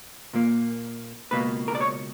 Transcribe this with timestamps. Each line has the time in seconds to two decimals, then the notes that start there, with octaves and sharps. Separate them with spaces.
0.33 A#2 A#3
1.31 C#2 B2 A#3 B4
1.68 A#4
1.75 D5
1.81 C#5